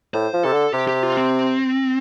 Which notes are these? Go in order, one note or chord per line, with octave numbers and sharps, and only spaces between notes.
A2 C5
F3
C3 A4
D3
C3 G4
G4
F4
C4